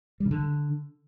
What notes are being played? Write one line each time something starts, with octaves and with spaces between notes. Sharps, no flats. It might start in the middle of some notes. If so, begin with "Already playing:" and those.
G3
C#3
D3